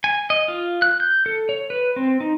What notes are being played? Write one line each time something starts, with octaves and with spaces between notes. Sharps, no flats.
G#5
D#5
F4
F#6
G6
A4
C#5
B4
C4
D#4